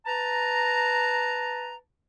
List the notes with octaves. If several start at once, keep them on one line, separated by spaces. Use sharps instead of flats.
B4 A5 A#5